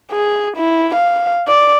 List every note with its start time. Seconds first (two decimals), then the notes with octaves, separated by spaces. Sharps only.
0.12 G#4
0.57 E4
0.95 F5
1.48 D5